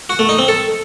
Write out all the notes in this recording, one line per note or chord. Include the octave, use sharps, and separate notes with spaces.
F#4
A3
D#4
C4
A4